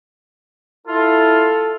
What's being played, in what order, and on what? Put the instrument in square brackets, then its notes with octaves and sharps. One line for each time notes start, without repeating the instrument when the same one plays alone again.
[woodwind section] E4 F4 [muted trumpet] A4